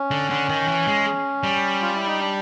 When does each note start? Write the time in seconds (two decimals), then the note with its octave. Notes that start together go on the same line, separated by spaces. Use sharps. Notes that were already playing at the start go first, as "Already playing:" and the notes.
Already playing: C#4
0.11 D3
0.30 D3
0.49 D#3
0.68 E3
0.87 G#3
1.43 G3
1.82 F4
1.95 E4
2.07 D#4
2.20 D4